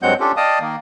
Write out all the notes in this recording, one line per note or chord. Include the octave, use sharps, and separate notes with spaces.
G2 F#3 G#3 C4 F#5 G6
C#4 D4 F4 G4 A4
D5 D#5 F5 G5 A5 D#6
D#3 A#3